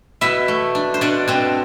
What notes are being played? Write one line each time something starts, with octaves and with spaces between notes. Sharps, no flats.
B2 E4 E5
A3
D4
C5
B2 D4 D5
B2 C4 C5